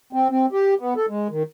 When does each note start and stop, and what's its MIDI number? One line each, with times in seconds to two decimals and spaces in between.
0.13 0.28 60
0.30 0.46 60
0.52 0.74 67
0.79 0.94 59
0.96 1.06 69
1.09 1.28 56
1.30 1.43 51